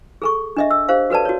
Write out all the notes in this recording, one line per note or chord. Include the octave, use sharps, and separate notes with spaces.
G#4 A4 C#6
D4 D#5 E5
E6
G4 C5 F5
F#4 A4 B4 D5 A5
F#4 C#5